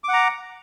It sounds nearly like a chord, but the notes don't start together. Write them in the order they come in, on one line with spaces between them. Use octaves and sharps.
D6 F#5 A#5